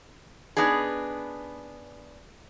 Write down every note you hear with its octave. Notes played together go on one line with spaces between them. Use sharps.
B3 D4 D#4 G#4